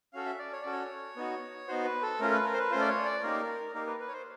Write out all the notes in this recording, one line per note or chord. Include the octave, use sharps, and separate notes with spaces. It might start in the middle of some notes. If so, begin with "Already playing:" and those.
C#4 F#4 A4 F5
E5
D5
C#5
C#4 F#4 A4 D5
C#5
B3 D#4 F#4
B3 D#4 F#4 C5
B4
A4
A3 C#4 F4 A#4
B4
A#4
C5
B4
A3 C#4 F4 C5
D5
C#5
D5
A#3 D#4 G4 A#4
A#3 D#4 G4 A#4
B4
B4
C#5
C5